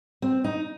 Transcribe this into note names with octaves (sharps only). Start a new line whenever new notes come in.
C4
D#4